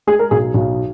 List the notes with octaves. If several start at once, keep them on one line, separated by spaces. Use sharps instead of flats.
G#3 G#4
A#4
B1 G#4
B1